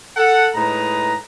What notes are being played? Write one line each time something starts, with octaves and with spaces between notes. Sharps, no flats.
A4 F#5
A2 G#3 D#4 B4 A#5